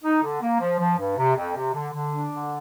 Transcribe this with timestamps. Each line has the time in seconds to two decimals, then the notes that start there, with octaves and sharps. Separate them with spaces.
0.04 D#4
0.23 D3
0.41 A#3
0.60 F3
0.79 F3
0.98 G2
1.17 C3
1.36 F2
1.56 C3
1.74 D3
1.93 D3
2.13 D4
2.31 D3